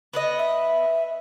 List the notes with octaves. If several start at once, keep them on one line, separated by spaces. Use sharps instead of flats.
B3 B4 D#5
E5